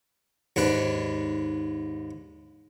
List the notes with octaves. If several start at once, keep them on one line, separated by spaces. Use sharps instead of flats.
D#2 G#2 D4 B4